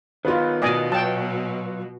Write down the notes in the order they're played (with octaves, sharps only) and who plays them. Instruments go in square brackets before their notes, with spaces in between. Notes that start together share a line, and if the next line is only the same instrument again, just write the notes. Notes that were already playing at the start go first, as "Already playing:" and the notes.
[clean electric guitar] D#3 B3 D#4 [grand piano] F4 B4
[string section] B2 [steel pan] D5 D#5 G#5
[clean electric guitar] F#3 [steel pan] G5 A5